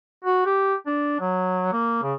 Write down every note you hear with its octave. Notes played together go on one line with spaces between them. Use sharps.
F#4
G4
D4
F#3
A#3
C#3